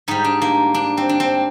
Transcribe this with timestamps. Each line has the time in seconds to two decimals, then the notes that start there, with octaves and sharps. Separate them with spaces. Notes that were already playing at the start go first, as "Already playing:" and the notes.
0.08 G#2 G3 D#4
0.24 D4
0.42 A#3
0.74 D4
0.97 C4
1.09 D4
1.20 C4